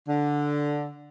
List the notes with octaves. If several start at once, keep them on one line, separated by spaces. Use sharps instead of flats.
D3